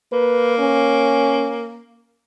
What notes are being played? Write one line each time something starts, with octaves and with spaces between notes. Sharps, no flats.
A#3 B4
C#4